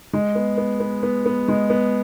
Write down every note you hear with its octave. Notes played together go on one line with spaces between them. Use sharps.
G#3
B3
B3
B3
B3
B3
G#3
B3